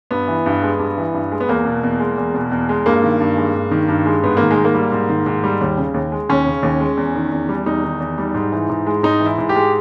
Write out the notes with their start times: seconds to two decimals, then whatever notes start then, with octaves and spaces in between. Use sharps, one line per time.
0.11 G2 B3
0.28 E3
0.46 G2
0.63 G#3
0.79 G2
0.97 E3
1.14 G2
1.32 G#3
1.40 B3
1.49 E2 A#3
1.65 B2
1.83 E2
2.00 G#3
2.18 E2
2.34 B2
2.52 E2
2.69 G#3
2.86 G2 A#3
3.03 D#3
3.21 G2
3.37 G#3
3.54 G2
3.71 D#3
3.88 G2
4.06 G#3
4.23 G#2 B3
4.37 D#3 A#3
4.51 G#3
4.57 G#2
4.65 A#3
4.74 G3
4.92 G#2
5.09 D#3
5.26 G#2
5.44 G3
5.61 D#2
5.77 C#3
5.94 D#2
6.12 G#3
6.29 D#2 C#4
6.46 C#3
6.63 D#2
6.80 G#3
6.97 E2
7.15 D#3
7.32 E2
7.49 G3
7.66 E2 D#4
7.83 D#3
8.00 E2
8.18 G3
8.34 G#2
8.52 E3
8.69 G#2
8.87 G#3
9.03 G#2 D#4
9.20 E3
9.26 E4
9.38 G#2
9.49 G4
9.56 G#3